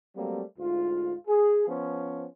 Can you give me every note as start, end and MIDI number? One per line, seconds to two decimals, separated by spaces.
0.16 0.42 54
0.16 0.42 55
0.16 0.42 57
0.16 0.42 58
0.16 0.42 60
0.58 1.13 38
0.58 1.13 44
0.58 1.13 65
1.28 1.66 68
1.68 2.26 53
1.68 2.26 59
1.68 2.26 61
1.68 2.26 72